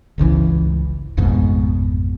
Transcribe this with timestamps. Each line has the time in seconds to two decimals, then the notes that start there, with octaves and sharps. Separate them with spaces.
0.18 G1 C#2 C3 E3
1.17 A1 F2 G#2 B2